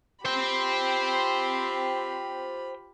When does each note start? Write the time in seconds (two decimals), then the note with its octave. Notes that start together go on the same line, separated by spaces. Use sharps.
0.25 F4 G4 C5 G5 B5